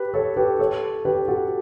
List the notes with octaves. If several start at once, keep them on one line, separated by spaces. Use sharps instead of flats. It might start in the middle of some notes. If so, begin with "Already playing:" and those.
Already playing: G4 B4
A4 C#5
G4 B4
A4 C#5
G4 B4
F#4 A4